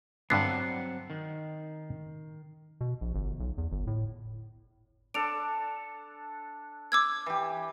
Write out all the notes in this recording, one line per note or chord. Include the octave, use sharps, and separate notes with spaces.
G2 D3 F#3 B3 C4 F#5 C7
D#3
B2
A#1
G1
B1
E2
G1
A2
D4 A4 D7 F7
D6 E6 G#6
E3 G4